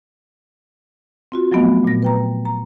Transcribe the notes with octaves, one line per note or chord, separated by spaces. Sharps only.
C4 F4 F#4
F3 F#3 A3 B3 D#5
A#2 A#6
B4 G5 A#5
A#5